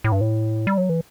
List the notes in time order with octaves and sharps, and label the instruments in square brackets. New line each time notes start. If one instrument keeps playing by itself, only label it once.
[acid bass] A2
G2
A2
G3
F#3
E3